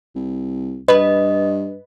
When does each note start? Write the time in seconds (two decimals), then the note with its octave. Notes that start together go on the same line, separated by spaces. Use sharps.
0.15 C2
0.88 G2 B4 D#5